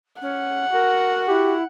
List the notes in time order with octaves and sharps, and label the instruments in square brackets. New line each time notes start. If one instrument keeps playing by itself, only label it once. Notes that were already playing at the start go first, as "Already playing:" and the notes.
[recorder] C#4 [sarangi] F#5
[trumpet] F#4 [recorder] A#4
[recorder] E4 [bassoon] G4